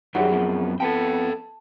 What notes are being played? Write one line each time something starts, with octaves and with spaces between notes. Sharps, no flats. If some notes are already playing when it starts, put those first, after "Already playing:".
F#2 D#3 F#3 G3 G#4 E5 F#5
F2 B2 F3
F2 B3 A4 G5 A5